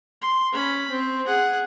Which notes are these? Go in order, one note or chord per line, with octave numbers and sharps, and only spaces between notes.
C6
C#4 B5
C4
G#4 F#5